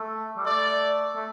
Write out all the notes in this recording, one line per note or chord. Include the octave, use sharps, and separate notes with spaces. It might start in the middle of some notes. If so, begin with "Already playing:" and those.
Already playing: A3
G3
A3 D5
A3